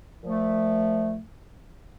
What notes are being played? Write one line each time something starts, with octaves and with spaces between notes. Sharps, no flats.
A#2 F3 A3